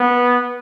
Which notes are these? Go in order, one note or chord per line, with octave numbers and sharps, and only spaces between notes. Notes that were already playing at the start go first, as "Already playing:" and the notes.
Already playing: B3